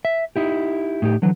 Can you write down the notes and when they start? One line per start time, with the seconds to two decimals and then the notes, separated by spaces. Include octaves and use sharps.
0.05 E5
0.36 D#4 E4 G4
1.02 A2 D#4 G4
1.22 D3 E3 F#3